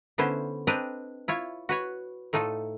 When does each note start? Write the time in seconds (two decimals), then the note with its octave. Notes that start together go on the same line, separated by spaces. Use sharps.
0.18 D3 B3 C#4 E4 C5
0.67 C4 D4 B4 D#5 G5 A#5
1.28 E4 F4 C#5
1.69 F#4 B4 C#5
2.33 A2 A3 D#4 F4 A4